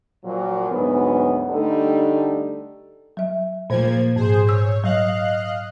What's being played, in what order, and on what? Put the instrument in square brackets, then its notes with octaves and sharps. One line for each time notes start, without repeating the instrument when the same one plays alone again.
[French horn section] A#2 F3 F#3
D2 G#2 F#3 B3
D3 G3 A3 D#4 A4
[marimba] F#3 E5
[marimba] A#2 A3 C5 [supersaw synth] F3 A#3 G#6
[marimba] G#2 [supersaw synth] G#4 C5
[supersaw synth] C#5 [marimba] E6 G6
[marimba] F#3 [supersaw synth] D#5 F5 F#6